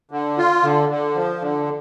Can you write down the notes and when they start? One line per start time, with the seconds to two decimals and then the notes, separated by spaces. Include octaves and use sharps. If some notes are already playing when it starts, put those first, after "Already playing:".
0.11 D3
0.38 F4
0.63 D3
0.89 D3
1.15 F3
1.41 D3